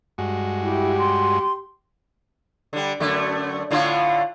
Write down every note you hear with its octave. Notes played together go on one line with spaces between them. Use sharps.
G2 G#3 F#4
E4 G4
C6
D3 G3
F#2 D3 A3
A2 D3 F4